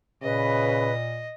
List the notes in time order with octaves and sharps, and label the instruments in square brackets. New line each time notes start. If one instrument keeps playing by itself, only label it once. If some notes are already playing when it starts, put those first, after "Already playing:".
[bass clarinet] A#2 [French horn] C#3 [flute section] B4 [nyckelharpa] D#5